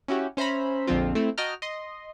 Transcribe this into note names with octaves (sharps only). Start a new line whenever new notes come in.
C#4 E4 F#4 G4
C#4 C5 E5 A#5 B5
A#1 F2 D3 F3 C4 F4
A3 C4 E4
F#4 D#5 G5 A5 A#5 F6
D#5 C6